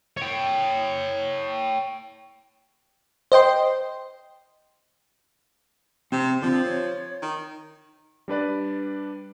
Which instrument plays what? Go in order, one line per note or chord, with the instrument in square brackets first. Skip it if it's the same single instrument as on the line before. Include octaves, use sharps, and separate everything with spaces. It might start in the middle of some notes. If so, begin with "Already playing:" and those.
[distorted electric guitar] C#5 G5
[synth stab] C5 D#5 G5 C6
[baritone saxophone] C3 [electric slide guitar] C4
[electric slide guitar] D3 C4 [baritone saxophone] F3
[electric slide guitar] C#5
[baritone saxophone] D#3
[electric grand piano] G3 D4 B4 D5